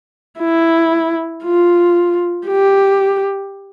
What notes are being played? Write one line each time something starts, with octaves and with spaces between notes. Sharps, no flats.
E4
F4
G4